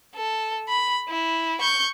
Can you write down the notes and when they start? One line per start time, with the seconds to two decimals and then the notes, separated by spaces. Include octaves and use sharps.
0.15 A4
0.69 B5
1.09 E4
1.62 C#6 G6